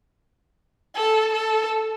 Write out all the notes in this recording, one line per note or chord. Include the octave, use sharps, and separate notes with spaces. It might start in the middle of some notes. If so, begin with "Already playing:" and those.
A4
A4